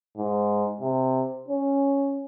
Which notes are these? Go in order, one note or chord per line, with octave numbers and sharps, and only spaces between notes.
G#2
C3
C#4